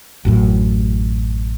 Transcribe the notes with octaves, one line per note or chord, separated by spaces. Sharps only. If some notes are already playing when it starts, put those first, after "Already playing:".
A1 F#2 A2